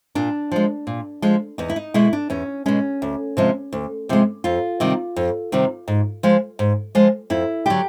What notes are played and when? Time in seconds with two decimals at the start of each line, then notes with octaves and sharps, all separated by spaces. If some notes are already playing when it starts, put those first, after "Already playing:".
0.15 A#2 D4
0.52 F3 G#3
0.87 A#2
1.22 F3 G#3
1.58 E2 D#4
1.70 E4
1.76 D#4
1.94 B2 G#3 E4
2.13 D4
2.30 E2 C#4
2.66 B2 G#3 C#4
3.02 D2
3.37 C3 F3 G#3
3.73 D2
4.09 C3 F3 G#3
4.44 F2 F4
4.80 C3 D#3 G3
5.16 F2
5.52 C3 D#3 G3
5.88 G#2
6.23 F3 G#3
6.59 G#2
6.95 F3 G#3
7.30 F2 E4
7.66 D3 F#3 G4